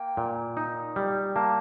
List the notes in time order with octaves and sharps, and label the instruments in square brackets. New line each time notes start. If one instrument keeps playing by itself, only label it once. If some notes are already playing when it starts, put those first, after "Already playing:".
Already playing: [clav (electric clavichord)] A#3 [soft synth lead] G5
[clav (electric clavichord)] A#2
D#4
G3
[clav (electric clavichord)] A#3 [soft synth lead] A5